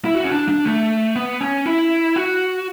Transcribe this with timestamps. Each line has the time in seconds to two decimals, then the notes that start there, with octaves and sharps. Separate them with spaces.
0.05 E4
0.15 F#4
0.24 C#4
0.31 D4
0.49 D4
0.65 A3
1.16 B3
1.41 C#4
1.66 E4
2.16 F#4